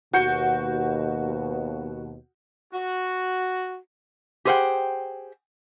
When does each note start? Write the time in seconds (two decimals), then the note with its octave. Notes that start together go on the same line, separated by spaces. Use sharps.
0.13 D#2 B2 F#4 G6 C#7
2.73 F#4
4.45 G4 G#4 C5 E5 F#5 G5